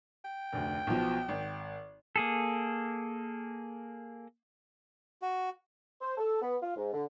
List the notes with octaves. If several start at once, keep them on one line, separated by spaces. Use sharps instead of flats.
G5
F1 D2
B1 B2 F3
G#1
A#3 G#4 A4
F#4
C5
A4
B3
F4
G#2
D3